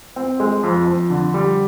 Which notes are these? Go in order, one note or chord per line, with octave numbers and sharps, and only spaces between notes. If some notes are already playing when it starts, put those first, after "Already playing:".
C4
G#3
F2
F2
D3
G3